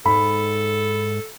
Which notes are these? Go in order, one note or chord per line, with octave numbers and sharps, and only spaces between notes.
G#2 A4 B5